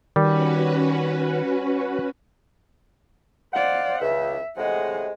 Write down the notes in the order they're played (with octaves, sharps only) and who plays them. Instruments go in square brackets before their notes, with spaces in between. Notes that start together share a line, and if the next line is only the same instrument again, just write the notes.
[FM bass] D#3 [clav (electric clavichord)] G3 [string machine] C#4 F#4 B4
[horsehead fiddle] C5 D5 [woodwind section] D#5 F5 F#5
[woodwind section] C#2 [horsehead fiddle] E5
[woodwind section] A2 C3 G#3 [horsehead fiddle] F#5 G#5